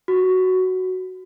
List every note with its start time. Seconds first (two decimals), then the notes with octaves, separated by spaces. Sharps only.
0.08 F#4